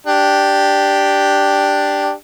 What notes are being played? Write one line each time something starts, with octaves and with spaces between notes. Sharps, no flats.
D4 G4